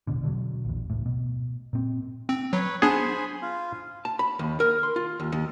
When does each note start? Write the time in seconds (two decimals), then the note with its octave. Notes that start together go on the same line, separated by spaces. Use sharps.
0.07 E1 A1 B2 D3
0.23 B2 D3 F3 F#3
0.65 A#1 E2
0.90 C#2 A2
1.06 B2
1.73 A#2 C4
2.29 C4
2.53 F#3 B4 C#5
2.82 B3 D4 G#4 C5 G#5 B5
3.42 F4
4.05 A5
4.19 B5
4.39 D#2
4.60 A#4
4.83 C6
4.96 F4
5.20 D#2
5.32 D#2